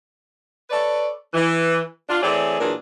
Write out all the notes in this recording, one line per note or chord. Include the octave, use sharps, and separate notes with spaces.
A4 B4 C#5 D5
E3
D4 F4
E3 A3 C4 G#4 C#5 D5
A#2 E3 F#3 D4 G#4 A#4